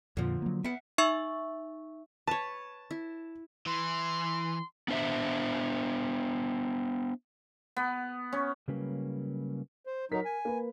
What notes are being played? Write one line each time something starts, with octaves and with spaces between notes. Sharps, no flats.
F2 A#2 D3 F3
F#3 A#3
B3 E5 F#5
D#4 E5 C#6 E6
B4 C#5 A5
E4
E3 C6
B3 D4 C5 E5
B3
C#4
C#3 F#3 G3 A#3 C#4 B4
C5
F#3 D#4 A#4 B6
G#5
A#3 B4